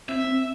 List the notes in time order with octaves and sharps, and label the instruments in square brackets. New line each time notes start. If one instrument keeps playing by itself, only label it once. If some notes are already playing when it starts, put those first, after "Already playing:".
[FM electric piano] C4 [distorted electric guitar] E5
[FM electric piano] C4